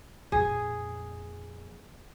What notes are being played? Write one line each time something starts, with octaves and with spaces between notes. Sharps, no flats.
F2 A#2 G#4